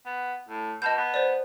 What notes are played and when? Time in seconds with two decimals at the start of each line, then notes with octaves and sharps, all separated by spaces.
0.06 B3
0.49 A2
0.82 B2 D#5 A5 G6
0.98 B3
1.14 C5 D5